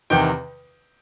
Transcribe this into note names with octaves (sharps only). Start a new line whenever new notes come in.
E2 C3 D#3 G5